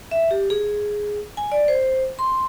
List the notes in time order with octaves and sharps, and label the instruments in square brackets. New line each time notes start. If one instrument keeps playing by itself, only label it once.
[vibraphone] E5
G4
G#4
G#5
D5
C5
C6